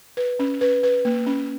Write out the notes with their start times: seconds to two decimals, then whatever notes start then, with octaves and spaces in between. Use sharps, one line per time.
0.17 B4
0.39 C#4
0.61 B4
0.83 B4
1.05 A#3
1.26 C#4